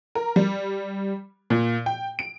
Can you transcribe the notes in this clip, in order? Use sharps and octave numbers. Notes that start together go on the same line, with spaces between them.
A#4
G3
A#2
G5
D7